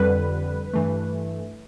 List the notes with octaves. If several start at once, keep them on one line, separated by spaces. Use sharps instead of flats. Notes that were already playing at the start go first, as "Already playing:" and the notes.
Already playing: F2 D3 G3 B4
G2 E3 A3